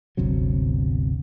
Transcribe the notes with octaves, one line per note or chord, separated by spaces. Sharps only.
G1 D2 C3 F#3